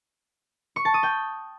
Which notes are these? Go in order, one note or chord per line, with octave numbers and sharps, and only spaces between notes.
C#6
A5
D#6
G5